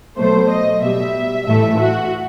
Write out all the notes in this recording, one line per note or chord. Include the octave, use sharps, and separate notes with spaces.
B2 F#3 A3 C5
D#5
B2 G3 E5
A2 E3 A3 E5
F#4